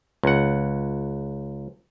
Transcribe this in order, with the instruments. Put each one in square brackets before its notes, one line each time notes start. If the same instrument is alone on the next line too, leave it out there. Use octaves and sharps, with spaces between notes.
[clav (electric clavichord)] C#2 F#5